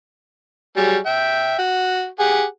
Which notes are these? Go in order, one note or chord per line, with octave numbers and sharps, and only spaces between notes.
F#3 G3 G#4
E5 G5
F#4
G4 G#4 F#5